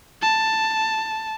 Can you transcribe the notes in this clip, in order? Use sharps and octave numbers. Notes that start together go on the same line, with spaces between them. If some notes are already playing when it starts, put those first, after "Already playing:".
A5